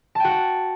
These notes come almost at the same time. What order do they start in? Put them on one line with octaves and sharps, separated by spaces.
A5 G5 F#4